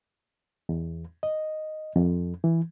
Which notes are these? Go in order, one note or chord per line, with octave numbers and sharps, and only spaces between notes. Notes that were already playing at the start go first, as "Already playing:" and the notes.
E2
D#5
F2
E3